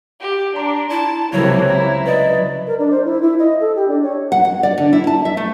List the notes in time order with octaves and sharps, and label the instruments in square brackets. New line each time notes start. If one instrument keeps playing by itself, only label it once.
[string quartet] G4
[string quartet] D4 [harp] A#5 C6 D6
[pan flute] E4 [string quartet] A5
[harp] C#2 F#3 [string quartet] C3 E3 A#3 [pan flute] C#5
[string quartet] E4 [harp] A#5
[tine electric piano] B4 D#5 [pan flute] D5
[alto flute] A#4
D4
C5
E4
E4
D#5
A4
G4
D4
C#5
[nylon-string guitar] F#5
F#5
D5
D3
E4
A5
E5
A3